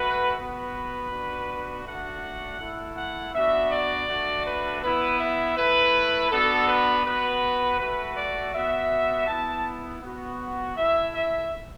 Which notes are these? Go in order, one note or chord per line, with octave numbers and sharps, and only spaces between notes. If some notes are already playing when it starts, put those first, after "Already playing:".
Already playing: A3 F#4 B4
B3 F#4 B4
B3 D4 F#4
A3 D4 F#4 F#5
A3 E4
F#5
B3 D4 F#4 E5
D5
A3 D4 F#4
B4
B3 E4 B4
E5
A3 E4 B4
B3 D4 F#4 A4
B4
B3 F#4 B4
A3 F#4 B4
D5
B3 F#4 E5
B3 E4 A5
B3 F#4
A3 E4 E5
E5